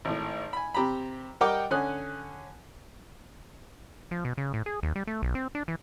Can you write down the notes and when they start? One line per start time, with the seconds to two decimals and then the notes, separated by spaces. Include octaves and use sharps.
0.05 G#1 A2
0.53 G#5 B5
0.75 C3 G4 A#5 B5
1.41 G3 A#4 D#5 F#5 G5 D6
1.71 D3 C#4 G#5 D#6 F#6
4.11 F3
4.25 B2
4.38 C#3
4.54 A2
4.66 G#4
4.83 D#2
4.96 G3
5.07 A3
5.23 B1
5.35 C4
5.55 D4
5.68 E3